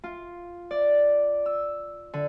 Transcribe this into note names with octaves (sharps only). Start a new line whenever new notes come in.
F4
D5
E6
D3